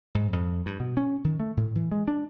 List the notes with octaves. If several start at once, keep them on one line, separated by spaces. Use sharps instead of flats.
G#2
F2
G2
B2
C#4
D#3
A3
A2
E3
G#3
D4